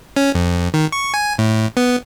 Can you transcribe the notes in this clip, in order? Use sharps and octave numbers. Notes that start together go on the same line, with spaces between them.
C#4
F2
D#3
C#6
G#5
A2
B3